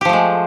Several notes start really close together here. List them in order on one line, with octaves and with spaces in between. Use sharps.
G4 F3 A3 G#3